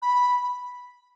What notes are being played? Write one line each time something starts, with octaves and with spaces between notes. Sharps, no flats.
B5